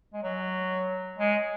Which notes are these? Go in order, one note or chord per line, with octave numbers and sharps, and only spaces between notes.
G#3
F#3
G#3